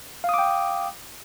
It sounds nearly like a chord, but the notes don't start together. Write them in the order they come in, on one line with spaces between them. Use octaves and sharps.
F5 D#6 D6 G5